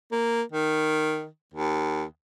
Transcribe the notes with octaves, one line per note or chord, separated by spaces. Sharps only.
A#3
D#3
D#2